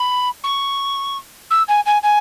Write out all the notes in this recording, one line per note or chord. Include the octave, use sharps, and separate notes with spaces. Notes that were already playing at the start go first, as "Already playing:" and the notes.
Already playing: B5
C#6
E6
G#5
G#5
G#5